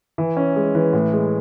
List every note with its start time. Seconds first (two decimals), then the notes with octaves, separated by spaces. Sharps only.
0.18 E3
0.37 C#4
0.56 G#3
0.75 E3
0.93 A2
1.13 G#3